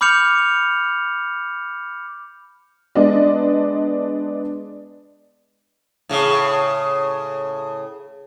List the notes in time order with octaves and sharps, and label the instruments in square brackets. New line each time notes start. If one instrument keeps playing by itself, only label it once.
[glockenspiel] B5 D6 F6 G6 C#7 F7
[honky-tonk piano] G#3 B3 D4 D5 D#5
[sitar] A2 C#3